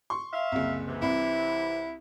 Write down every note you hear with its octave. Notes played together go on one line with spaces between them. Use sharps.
C6 C#6
E5 F5
F#1 C2
C3 E3
C2 E4 B5